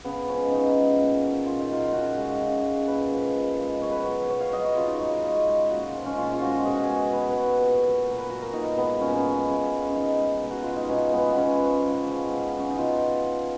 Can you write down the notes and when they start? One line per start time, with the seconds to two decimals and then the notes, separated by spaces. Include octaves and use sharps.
0.05 C#3 B3
0.28 F3 G#3 C#4
0.51 C#3 D#4
0.75 F3 G#3
0.98 A#2
1.22 F#3
1.46 A#2 F4
1.59 D#4
1.70 F#3 F4
1.93 C#3 F#4
2.17 G#3
2.41 C#3
2.64 G#3
2.87 A#2 B4
3.11 F3 G#3
3.35 A#2
3.59 F3 G#3
3.82 B2 C#5
3.91 B4
4.01 F#3 C#5
4.29 B2 C#5
4.41 F5
4.53 F#3 D#5
4.64 C#5
4.76 C#3 F4
4.87 D#4
4.99 G#3 C#5
5.12 D#5
5.23 C#3 D#5
5.47 G#3 D#5
5.70 A#2 F#4
5.82 F4
5.94 F3 G#3
6.06 C#4
6.18 A#2 F4
6.33 F4
6.41 F3 G#3 F#4
6.64 B2 G#4
6.74 F#4
6.83 G#4
6.88 G#3
7.12 B2 B4
7.20 C#5
7.30 B4
7.35 G#3
7.59 A#2
7.83 F#3
8.06 A#2 A#4
8.18 B4
8.30 F#3 F#4
8.42 A#4
8.53 A#2 D#4
8.77 G#3 B3
9.01 A#2 C#4
9.09 B3
9.16 C#4
9.25 G#3
9.48 C#3
9.72 G#3
9.89 C#4
9.95 C#3 D#4
10.19 G#3
10.42 B2
10.50 F#4
10.63 G#3 F4
10.76 D#4
10.89 B2 C#4
11.13 G#3 B3
11.33 C#3 B3 C#4
11.60 F3 G#3
11.84 C#3
12.08 F3 G#3
12.32 B2
12.55 F#3 C#4
12.69 D#4
12.78 B2 F4